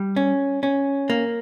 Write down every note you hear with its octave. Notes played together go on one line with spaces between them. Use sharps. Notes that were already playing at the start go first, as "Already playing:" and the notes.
Already playing: G3
C#4
C#4
A#3